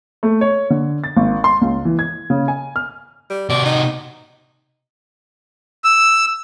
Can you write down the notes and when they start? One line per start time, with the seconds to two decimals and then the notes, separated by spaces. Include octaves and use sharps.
0.23 A3
0.41 C#5
0.70 D3
1.04 A6
1.16 G#1
1.44 C6
1.61 C#2
1.85 E3
1.99 G#6
2.30 C#3
2.48 G#5
2.76 F6
3.30 G3
3.50 C3 F#4 D5
3.66 D#4
5.84 E6